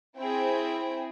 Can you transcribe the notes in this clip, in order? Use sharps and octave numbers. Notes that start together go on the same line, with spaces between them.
C4 E4 G#4 G5